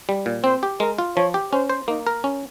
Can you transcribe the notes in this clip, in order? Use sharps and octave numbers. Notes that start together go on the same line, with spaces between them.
G3
A#2
C4 C5
G4
G#3 A#4
F4
F3 C#5
G4
C#4 C5
C5
A#3 D#4
A#4
C#4